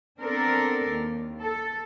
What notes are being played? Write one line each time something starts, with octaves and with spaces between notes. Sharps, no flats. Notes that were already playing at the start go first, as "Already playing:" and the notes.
B3 C4 D4 A4 A#4
D#2
A4